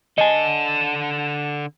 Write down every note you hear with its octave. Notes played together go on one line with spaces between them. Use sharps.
D3 D#5 G#5 A5